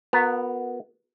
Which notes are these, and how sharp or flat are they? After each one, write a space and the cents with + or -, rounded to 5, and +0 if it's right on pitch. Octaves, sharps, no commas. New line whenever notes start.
B3 +0 F#4 -40 A#4 -5